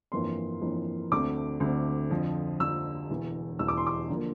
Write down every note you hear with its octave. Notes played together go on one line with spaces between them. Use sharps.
G1 F2 E3 A#3 C6
G1 F2 E3 A#3
D2 D3 A3 C4 D6
D2 D3 A3 C4
F2 D3 F3
F2 D3 F3 E6
E1 E2 E3
E1 E2 E3 E6
D6
C6
D6
D3 F3 A#3